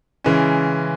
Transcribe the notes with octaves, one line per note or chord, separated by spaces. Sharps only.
C#3 E3 G#3 C#4